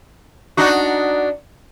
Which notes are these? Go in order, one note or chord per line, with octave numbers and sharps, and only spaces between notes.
D4 D#4 F#4